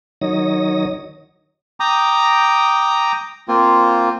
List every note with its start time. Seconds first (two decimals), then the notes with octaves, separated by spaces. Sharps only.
0.21 D#3 F#3 D#4 C#5 D#6 A#6
1.80 G5 A#5 D6 D#6
3.48 A#3 C4 F4